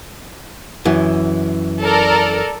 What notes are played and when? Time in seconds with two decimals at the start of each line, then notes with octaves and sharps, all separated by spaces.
0.85 F#2 E3
1.81 A4 A#4 D5